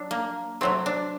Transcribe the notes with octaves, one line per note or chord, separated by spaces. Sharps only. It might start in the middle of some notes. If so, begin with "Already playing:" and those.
Already playing: F#3 D4
A#3
C3 F#3 A3 C4
D4